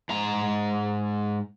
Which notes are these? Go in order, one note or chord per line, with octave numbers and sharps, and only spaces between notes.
G#2 A#5